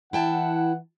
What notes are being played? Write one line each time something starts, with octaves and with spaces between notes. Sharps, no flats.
E3 E4 F#5 G5 A5